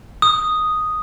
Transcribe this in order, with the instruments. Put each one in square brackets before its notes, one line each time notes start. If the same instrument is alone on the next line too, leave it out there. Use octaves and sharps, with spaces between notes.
[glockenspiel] D#6